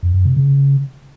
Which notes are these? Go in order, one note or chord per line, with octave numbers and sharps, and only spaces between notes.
F2
F#2
C3
C#3